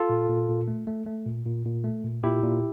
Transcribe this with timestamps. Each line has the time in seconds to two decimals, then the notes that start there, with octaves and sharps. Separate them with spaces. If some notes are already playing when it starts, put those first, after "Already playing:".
Already playing: F4 A4
0.09 A#2
0.29 A#2
0.49 A#2
0.68 A3
0.87 A3
1.06 A3
1.26 A#2
1.46 A#2
1.65 A#2
1.84 A3
2.04 A#2
2.23 A#2 E4 G4
2.42 A#2